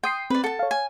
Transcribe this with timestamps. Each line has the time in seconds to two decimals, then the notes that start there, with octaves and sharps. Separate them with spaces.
0.03 G5 C6 D#6 C7
0.30 C4 B4 D5
0.44 A4 F#5 A5
0.59 C#5 F5
0.71 G#5